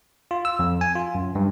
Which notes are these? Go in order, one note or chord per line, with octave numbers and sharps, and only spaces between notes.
F4
E6
F2
G#5
F4
F#2
G2